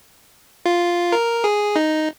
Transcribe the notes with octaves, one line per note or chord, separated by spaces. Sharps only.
F4
A#4
G#4
D#4